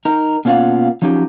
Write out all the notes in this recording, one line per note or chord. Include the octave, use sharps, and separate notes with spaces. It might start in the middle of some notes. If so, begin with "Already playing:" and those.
D#4 A#4
B2 A#3 C#4 F4 F5 F#5
F3 F#3 C#4 D#4 G4